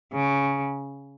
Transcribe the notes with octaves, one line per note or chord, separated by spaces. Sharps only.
C#3